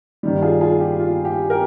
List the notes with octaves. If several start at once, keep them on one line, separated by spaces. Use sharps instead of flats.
G2 D#3 G3
F4 G#4
F4 G#4
G4
F4
G4
G4 A#4